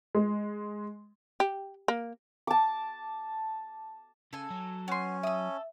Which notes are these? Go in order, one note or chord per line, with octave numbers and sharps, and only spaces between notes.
G#3
G4
A#3
A5 D6
C#3 A4 G#5
F#3
B3 C#4 C6
A4 E5 D#6